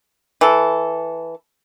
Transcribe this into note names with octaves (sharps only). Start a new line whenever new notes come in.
E3 A4